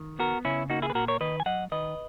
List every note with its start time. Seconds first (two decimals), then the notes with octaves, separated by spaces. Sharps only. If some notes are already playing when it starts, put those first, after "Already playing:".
Already playing: D#3
0.19 B3 F#4 A#4
0.45 C#3 C#4 E4
0.70 A#3 D#4 F#4
0.82 E4 G#4
0.90 B4
0.95 A#2 F#4 A#4
1.08 A#4 C#5
1.21 D#3 B4 D#5
1.40 G#5
1.46 F#3 D#5 F#5
1.72 D#3 B4 D#5